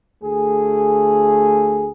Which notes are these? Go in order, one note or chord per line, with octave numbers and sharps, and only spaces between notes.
D2 A3 G#4